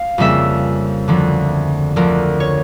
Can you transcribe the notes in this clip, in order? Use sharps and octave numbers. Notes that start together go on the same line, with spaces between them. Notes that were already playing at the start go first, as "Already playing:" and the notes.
Already playing: F5
F2 C#3 G3 A#3 E5
D2 D3 F3
D2 D3 F3 A#4
C#5